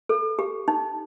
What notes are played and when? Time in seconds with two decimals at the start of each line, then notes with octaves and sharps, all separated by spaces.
0.09 A4
0.39 G4
0.68 D#4